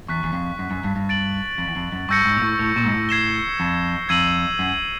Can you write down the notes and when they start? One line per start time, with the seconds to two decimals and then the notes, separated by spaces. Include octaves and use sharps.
0.08 E2 C#6 F#6 B6
0.24 E2
0.33 F2
0.59 F#2
0.71 F#2
0.84 G2
0.96 G2
1.09 A6 D7 F#7
1.58 F2
1.68 E2
1.76 F2
1.92 F#2
2.09 G2 C#6 E6 G6 A#6 C#7
2.25 G#2
2.37 A#2
2.42 A2
2.59 A2
2.76 A#2
2.85 G#2
2.92 A2
3.09 G#6 C7 E7 G7
3.60 F2
4.09 F2 E6 G#6 C7 D#7 F#7
4.59 F#2